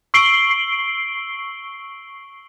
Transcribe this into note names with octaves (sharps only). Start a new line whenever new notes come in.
C#6 E6 C7 D7 F#7 G7